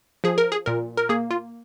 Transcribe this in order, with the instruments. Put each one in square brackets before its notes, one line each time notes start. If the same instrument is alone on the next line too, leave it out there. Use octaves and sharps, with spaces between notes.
[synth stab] F3 G#4
A#4
G#4
A#2 A#4
A#4
A#3 G#4
F4